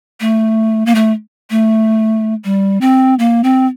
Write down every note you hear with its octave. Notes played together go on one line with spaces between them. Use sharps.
A3
A#3
A3
A3
G3
C4
A#3
C4